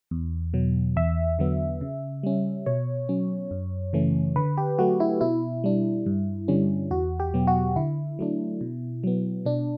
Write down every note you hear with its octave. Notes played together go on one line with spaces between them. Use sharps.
E2
B2 F#3
E2 E5
D3 F#3 B3
C#3
G3 C#4
B2 C#5
F#3 C#4
F#2
C#3 E3 A3 C#4
D3 B4
G4
F#3 A3 F#4
E4
B2 E4
G3 D4
G2
D3 G3 C#4
E2 F#4
G4
B2 F#3 B3
F#4
D3 E4
F#3 A3 D4
B2
F#3 B3
B2 D4